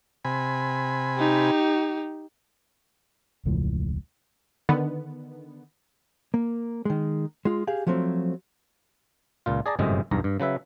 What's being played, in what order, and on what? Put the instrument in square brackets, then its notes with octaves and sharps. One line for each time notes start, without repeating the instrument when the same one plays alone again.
[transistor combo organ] C3 G#5 B5
[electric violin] D#4 G4
[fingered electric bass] E1 C#2 A2 F3
[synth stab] D3 D#3 B3
[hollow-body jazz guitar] A#3
D#3 G#3
G#3 F4
G4 G#4 F5
F3 F#3 A3 C4
[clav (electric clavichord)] C#2 A#2 F4
G#4 D5 A5 A#5
G1 F#2 A2 C3 G#3 D#5
B1 E2 G2 A#5
G2
C#3 F#3 B4 E5